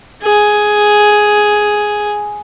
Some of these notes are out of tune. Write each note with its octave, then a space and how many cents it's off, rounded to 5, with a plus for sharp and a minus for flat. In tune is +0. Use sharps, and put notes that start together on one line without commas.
G#4 +5